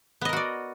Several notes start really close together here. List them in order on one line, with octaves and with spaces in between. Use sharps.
B3 D#5 A#4 F#4 D5